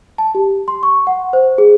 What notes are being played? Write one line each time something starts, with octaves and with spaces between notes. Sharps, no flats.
A5
G4
C6
C#6
F#5
C5
G#4